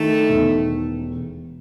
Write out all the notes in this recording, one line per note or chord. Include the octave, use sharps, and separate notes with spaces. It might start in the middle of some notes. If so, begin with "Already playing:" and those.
Already playing: D#3 A3
E1